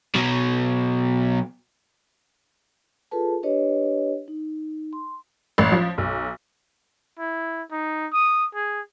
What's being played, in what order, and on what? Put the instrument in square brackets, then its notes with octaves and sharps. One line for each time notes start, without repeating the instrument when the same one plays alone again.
[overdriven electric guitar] B2 F#3
[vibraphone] F4 G#4 A4 B4 A5
D4 G4 B4 C#5 D#5
D#4
C6
[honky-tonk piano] A1
F3
B1
[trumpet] E4
D#4
D#6
G#4